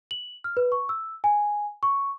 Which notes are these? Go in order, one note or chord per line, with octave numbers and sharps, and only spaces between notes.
F#7
F6
B4
C#6
E6
G#5
C#6